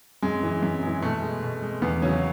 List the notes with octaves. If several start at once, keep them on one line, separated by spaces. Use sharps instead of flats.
F#2 G#3
E3 G#3
F#2
E3 G#3
B2 A3
G#3
B2
G#3
E2 B3
C#3 F#3 C#4